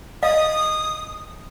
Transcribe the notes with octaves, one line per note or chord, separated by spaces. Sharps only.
D#5 F5 D#6